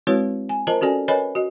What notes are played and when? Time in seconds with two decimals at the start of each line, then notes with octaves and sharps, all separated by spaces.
0.07 G#3 C4 E4 F#4 B4 C#5
0.49 G#5
0.67 F4 A#4 C5 D#5 A5 A#5
0.81 C#4 F#4 A4 D5 G#5
1.08 A#4 B4 C#5 D#5 G#5 B5
1.35 F#4 D#5